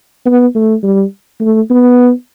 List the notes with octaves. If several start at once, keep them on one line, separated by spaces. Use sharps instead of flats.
B3
A3
G3
A3
B3